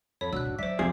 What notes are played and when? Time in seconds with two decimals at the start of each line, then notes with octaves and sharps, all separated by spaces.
0.21 F2 A4 C#5 B5
0.33 B2 D4 F#4 E6 F#6
0.45 G#2
0.59 F#3 C5 D5 E5 B6
0.79 F2 C3 F3 G#4 C7